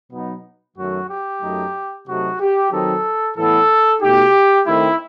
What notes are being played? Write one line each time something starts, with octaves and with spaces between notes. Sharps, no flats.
B2 F#3 B3 D#4
F#2 D#3 F#3 A3 F#4
G4
F#2 F#3 A3 D#4
C3 F#3 A3 D#4 F#4
G4
D#3 F#3 C4 D#4 A4
A2 E3 B3 A4
B2 A3 D#4 G4
D#3 A3 C4 E4